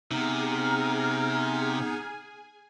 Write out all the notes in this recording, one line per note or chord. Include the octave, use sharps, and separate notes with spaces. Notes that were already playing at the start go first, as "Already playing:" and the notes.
C3 B3 D#4 G#4 G#5 A#5 F6